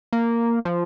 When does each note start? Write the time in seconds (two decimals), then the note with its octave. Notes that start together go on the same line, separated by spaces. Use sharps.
0.13 A#3
0.65 F3